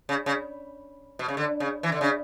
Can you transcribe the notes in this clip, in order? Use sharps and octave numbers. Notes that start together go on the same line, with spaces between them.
C#3
C#3
B2
C#3
D3
C#3
E3
D3
C#3